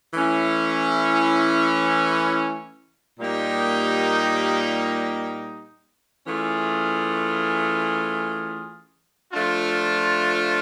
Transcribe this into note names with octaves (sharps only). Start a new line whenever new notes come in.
E3 A3 C#4 E4
A#2 G3 A#3 D#4 G4
E3 A3 C#4 F4 G#4
F3 A3 D4 F4